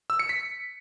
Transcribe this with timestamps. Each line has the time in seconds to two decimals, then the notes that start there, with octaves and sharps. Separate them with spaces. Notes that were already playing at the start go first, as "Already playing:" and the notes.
0.10 E6
0.19 C#7
0.29 B6